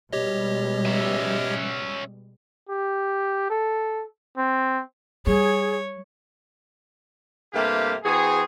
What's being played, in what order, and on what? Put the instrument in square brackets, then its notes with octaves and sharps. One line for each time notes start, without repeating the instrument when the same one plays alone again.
[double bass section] B2 G3 G#3 [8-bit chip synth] G4 C#5 D#5
[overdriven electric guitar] C#4 E5
[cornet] G4
A4
C4
[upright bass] G3 [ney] G#4 [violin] C#5
[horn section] G2 C3 A3 A#3 G4 F5
E3 C4 F#4 G#4